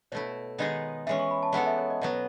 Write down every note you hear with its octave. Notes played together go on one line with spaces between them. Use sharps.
B2 A3 E4 C#5
D#3 G#3 B3 D#4 G#4 D#5
E3 G#3 C#4 E5
C#6
B5
A5
G#3 B3 E4 A4 F#5
E5
C#5
D#5
B2 F#3 B3 F#5